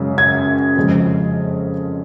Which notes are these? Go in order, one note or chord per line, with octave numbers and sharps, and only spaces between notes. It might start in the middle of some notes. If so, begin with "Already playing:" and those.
Already playing: F#2 C#3 G#3
G#6
F2 C#3 G#3